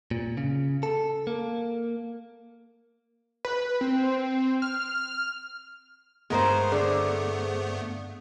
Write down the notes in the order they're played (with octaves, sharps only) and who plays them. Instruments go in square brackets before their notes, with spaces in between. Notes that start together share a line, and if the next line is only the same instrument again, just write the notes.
[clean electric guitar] A#2
C#3
A4
A#3
[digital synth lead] B4
C4
F6
[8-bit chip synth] G2 A3 B3 [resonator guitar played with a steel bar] G#3 A#4 C5
[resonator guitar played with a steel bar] D3 [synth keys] G#4 C5 D5